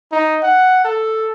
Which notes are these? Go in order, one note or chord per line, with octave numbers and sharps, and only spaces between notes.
D#4
F#5
A4